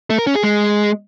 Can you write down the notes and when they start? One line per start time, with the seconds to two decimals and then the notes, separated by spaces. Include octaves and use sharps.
0.10 A3
0.19 A#4
0.27 C#4
0.35 G#4
0.44 G#3